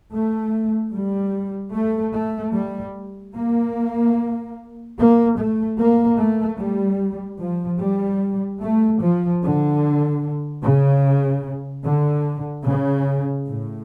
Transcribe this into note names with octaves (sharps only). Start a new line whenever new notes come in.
A3
G3
A3
A3
G3
A#3
A#3
A3
A#3
A3
G3
F3
G3
A3
F3
D3
C#3
D3
C#3
A2